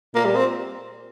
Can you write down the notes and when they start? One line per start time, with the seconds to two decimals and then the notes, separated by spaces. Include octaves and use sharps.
0.15 A#2 A#3
0.25 G3
0.36 C4